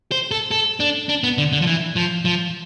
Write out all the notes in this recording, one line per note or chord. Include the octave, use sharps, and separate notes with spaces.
C5
A4
A4
D4
D4
B3
D3
D3
F3
E3
F3
F3